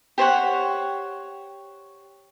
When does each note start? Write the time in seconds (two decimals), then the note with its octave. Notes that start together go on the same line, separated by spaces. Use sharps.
0.18 G4 C5 C#5 F#5